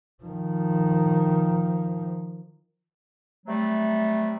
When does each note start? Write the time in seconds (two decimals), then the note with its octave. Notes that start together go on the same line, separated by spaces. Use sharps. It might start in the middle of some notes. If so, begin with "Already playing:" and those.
0.23 D#3 F3
3.46 C3 F#3 G3 A3